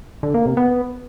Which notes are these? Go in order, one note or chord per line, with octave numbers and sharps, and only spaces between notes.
D3
A#3
C3
B3